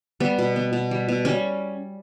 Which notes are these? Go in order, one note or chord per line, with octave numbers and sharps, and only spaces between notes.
G3 B3
B2
B3
B2
G3
B2
G3 C#4